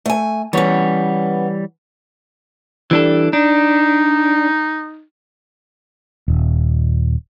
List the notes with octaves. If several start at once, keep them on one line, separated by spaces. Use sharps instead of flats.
A3 G#5
E3 G3 B3 C#4 C#5
E3 G3 D4 A4
D4 D#4
D#1